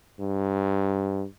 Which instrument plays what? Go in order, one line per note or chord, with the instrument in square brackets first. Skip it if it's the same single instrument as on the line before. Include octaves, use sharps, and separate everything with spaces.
[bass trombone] G2